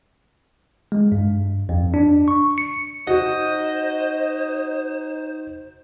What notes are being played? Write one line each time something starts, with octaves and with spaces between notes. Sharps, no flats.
G#3
G2
F2
D4
C#6
C#7
D#4 F#4 C5 D#5